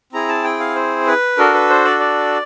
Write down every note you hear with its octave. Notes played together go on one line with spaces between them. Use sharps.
C4 E4 G#4 A#5
A5
G5
F5
C5
B4
D4 F#4 A4 A#4
B4
C5
D5
D5